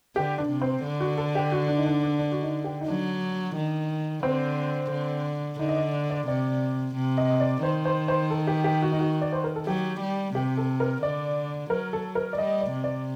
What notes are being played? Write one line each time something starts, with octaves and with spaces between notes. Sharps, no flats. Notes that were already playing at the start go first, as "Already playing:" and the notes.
D3 G4
D4
C3
C4
D3
F#4
A4
G4
F#4
D4
D#4
D4
D4
D4
F#4
D#4
G4
D#4
F#3 D4
D#3
D3 C4
D3
D3 D#4
D#5
D5
D5
C3 D5
C3
D#5
D5
D#3 C5
C5
C5
A4
G4
G4
F#4
D#4
F#4
D5
C5
A#4
A4
F#3 G4
G3
C3 G4
A4
A#4
D3 D5
F#3 A#4
A4
A#4
D5
G3 D#5
D5
C3
D5